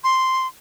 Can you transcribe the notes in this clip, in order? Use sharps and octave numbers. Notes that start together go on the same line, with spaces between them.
C6